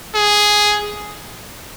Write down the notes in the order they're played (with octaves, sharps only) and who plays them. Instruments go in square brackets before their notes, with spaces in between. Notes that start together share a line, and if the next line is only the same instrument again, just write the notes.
[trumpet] G#4